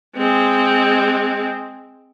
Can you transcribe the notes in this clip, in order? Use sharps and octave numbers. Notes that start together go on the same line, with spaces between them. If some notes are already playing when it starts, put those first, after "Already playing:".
G#3 C4